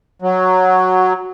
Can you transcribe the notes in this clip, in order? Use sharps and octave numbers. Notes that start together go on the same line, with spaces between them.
F#3